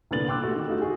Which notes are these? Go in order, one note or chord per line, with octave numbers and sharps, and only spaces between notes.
C2 A#2 D3 B3 A6 F#7
G5 C6 D6 E6 F#6
A3 F#4 G4
D#3
A3 D#4 F4 F#4
F#4 G#4